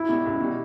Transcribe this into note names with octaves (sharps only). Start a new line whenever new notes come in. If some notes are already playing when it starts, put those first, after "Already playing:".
Already playing: E4
B2 G3
C#2
B2 G3